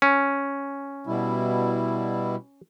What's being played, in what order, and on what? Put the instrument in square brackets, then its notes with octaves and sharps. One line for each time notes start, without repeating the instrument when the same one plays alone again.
[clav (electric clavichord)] C#4
[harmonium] B2 G3 E4